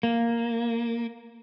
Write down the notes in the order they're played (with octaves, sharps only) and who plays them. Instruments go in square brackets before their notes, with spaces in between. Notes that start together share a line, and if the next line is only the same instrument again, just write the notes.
[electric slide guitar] A#3